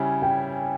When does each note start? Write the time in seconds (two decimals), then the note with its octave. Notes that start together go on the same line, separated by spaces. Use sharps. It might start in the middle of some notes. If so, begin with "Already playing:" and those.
Already playing: C#3 G3 C#4 E4 G#5
0.22 G5